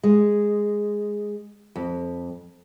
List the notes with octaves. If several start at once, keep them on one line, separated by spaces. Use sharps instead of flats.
G#3
F2